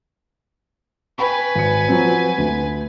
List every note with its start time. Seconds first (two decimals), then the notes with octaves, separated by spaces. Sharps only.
1.18 B4 G5 G#5 B5 C#6
1.55 G#1 C#7
1.89 F3 F#3 C4
2.38 D2